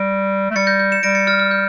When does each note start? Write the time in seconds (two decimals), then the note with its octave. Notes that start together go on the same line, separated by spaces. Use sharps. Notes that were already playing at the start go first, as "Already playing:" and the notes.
Already playing: G3 A#6 D7
0.51 A3
0.55 G3 A6 C#7
0.67 G6 A#6
0.79 G6
0.92 C#7 E7
1.03 G3 A#6 D7
1.15 A6 C#7
1.27 F6 A6
1.39 F6
1.51 G6